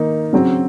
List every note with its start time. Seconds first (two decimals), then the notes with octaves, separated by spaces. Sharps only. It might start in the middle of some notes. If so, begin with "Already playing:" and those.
Already playing: D#3 A#3 D#4
0.33 C#3 F#3 C4